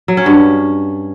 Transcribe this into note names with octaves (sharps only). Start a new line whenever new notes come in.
F#3
C#4
G2